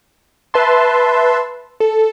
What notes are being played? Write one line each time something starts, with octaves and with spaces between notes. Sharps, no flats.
B4 E5 A5 C6
A4